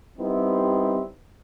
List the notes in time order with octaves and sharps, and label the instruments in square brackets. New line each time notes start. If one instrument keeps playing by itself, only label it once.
[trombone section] G3 B3 C4 D#4 E4